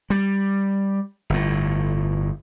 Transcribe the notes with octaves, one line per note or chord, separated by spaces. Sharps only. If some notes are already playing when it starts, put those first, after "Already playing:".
G3
G1 A2